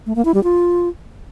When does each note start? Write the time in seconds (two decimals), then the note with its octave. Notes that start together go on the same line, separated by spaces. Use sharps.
0.06 A3
0.16 A#3
0.25 E4
0.34 G3
0.44 F4